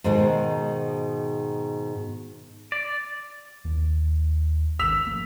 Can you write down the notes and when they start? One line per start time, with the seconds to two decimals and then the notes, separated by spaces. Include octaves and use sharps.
0.04 G#2 B2 D#3 G#3
2.72 D5
3.65 D#2
4.79 G#1 D#3 E6 B6 F7
5.07 F3 A3 A#3